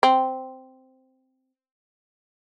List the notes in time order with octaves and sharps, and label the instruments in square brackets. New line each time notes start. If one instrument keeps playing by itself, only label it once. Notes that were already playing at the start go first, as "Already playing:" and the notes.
[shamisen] C4